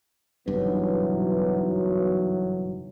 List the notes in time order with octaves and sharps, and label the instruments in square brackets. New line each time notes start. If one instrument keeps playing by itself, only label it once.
[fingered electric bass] F#1 G2 [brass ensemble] B1 E3 F#3 [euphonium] B3